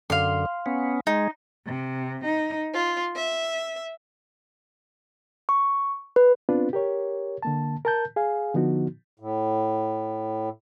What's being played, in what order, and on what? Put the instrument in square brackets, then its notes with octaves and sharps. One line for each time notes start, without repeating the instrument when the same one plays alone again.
[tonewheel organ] F#2 D3 [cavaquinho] F5 C6
[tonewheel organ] B3 C#4
[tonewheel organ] G#3 [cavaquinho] D#4
[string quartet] C3
D#4
F4
E5
[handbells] C#6
B4
[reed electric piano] B3 C4 D4 F4 B4
G4 A#4 C#5
D3 A#3 A5
A#4 A5 G6
G#4 F5 G#5
D3 F3 B3 D#4 F#4
[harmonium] A2